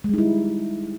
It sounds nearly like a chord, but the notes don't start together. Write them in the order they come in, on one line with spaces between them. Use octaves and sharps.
G#3 G3 D#4 E4